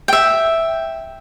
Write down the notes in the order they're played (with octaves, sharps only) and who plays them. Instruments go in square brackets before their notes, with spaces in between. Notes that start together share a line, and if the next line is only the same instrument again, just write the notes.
[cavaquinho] E5 G5